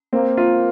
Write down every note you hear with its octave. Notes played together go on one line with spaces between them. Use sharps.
A#3 C4
F4